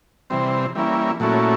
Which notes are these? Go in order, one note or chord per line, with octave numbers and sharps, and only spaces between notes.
C3 E3 G3 C4
E3 G3 A#3 C#4 E4
A#2 F#3 A3 C#4 E4